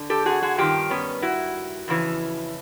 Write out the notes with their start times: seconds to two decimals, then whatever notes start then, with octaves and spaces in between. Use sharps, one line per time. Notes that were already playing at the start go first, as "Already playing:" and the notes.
Already playing: D3
0.10 G4 A4
0.26 F#4 G#4
0.42 F#4 G#4
0.58 G2 D#3 F4 G4
0.90 B3 C#4
1.22 E4 F#4
1.88 F2 C#3 E3